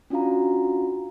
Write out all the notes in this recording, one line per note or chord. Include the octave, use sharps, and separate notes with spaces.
C#4 D4 F4 F#4 F5 A#5